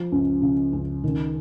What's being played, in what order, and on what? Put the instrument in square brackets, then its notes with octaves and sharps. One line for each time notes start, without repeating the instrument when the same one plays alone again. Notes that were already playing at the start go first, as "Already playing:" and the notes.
Already playing: [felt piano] F3
C#2
C#3
C#2
D#3